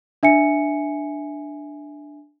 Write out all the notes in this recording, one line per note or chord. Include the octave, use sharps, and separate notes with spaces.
D4 E5 G#5 C#7